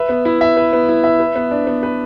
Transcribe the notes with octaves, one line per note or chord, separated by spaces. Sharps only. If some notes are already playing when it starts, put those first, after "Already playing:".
Already playing: B4 E5
B3
E4
E5
B4
B3
E4
E5
B4
B3
D4
B3
B4